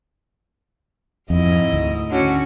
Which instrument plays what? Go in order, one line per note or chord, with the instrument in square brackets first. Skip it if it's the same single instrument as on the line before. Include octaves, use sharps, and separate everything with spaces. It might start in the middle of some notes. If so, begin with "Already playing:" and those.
[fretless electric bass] F2 [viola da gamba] G#2 E4 D#5
[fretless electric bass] D2
[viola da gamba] D3 C#4 F#4